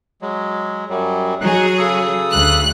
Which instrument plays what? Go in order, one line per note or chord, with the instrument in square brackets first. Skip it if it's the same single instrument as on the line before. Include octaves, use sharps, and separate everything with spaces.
[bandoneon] F#3 G#3
F#2 F#3 G3
[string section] F#3 G#4 [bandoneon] D#4 F#6
[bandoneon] C#3 A4 D#6
[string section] D2 F#6